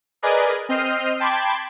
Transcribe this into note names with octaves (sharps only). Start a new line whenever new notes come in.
G#4 A#4 B4 D5 D#5 G#5
C4 D#5 F6 G6 C7 D#7
G5 A5 B5 C6 D6 G#6